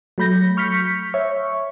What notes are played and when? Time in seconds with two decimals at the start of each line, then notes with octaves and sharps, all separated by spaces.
0.18 F#3 A3 B5 G6 A#6
0.57 C#6 F6 G6 B6 C#7
1.14 C#5 E5 C#6